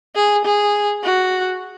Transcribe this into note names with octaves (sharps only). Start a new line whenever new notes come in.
G#4
G#4
F#4